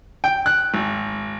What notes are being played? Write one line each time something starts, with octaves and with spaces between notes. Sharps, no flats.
G5
F#6
G#1